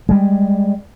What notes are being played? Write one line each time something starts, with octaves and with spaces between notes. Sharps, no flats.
G3 G#3